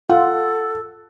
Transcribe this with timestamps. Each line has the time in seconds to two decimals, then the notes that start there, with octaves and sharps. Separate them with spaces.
0.10 F4 A4 F#5